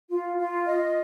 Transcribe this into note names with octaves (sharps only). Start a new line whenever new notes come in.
F4
F4
D#5